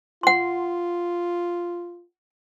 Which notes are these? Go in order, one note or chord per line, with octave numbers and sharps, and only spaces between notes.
F4 F#5 C6